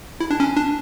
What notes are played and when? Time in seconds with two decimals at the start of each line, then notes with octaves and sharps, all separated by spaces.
0.20 E4
0.31 D4
0.40 C#4
0.57 D4